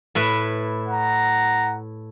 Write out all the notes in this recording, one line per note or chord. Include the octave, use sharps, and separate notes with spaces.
A2 E4 B4
F#5 A#5